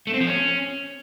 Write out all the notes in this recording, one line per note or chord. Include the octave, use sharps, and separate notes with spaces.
A3
C4
F3
C#4